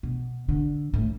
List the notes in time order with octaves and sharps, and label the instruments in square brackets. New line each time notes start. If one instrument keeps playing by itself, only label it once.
[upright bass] B2
D3
A2